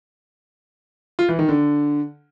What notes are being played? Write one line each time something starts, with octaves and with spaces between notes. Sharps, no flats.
F4
E3
D#3
D3